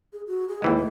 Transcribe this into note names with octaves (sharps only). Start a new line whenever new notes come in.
G#4
F#4
G#4
D#2 E3 G#3 G5
A3